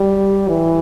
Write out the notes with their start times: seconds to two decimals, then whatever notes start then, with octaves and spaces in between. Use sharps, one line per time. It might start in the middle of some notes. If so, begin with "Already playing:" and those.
Already playing: G3
0.48 E3